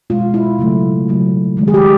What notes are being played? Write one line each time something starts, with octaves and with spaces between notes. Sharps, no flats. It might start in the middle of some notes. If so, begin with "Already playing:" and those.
B2 G#3 F4
E4
C#3 F#3 A3
C#3 F#3 A3
D#3 G#3
G#4
G4